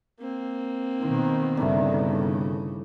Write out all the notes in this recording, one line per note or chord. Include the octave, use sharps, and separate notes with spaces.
A#3 C4
B2 D#3 C5
G1 A2 C#3 D4